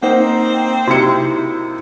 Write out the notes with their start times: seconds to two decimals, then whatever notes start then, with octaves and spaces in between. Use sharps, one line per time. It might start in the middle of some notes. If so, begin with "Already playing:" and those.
0.03 A#3 C4 D#4 C5 F#5
0.88 C3 E4 F#4 C#7